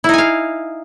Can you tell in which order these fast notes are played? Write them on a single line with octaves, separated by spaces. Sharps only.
E4 D#4 G#5 F5